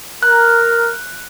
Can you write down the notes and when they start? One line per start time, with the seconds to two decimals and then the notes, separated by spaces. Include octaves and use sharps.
0.23 A#4 F#6